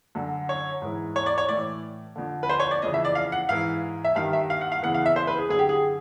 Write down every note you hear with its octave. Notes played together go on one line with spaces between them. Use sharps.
F#2 D3
C#5
G#2 E3
C#5
D5
C#5
A2 E3 D5
F2 D3
B4
C5
C#5
D5
F2 C#3 E3 D#5
E5
D5
F5
F#5
G#2 E3 F5
E5
G2 D#3 F5
E5
F5
F#5
F5
E2 C#3 E3 F#5
F5
E5
C5
B4
G#4
F#2 D3 G#4
G4
G#4